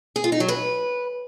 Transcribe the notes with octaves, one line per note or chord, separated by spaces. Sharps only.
G#4
F4
D#4
F#3
B4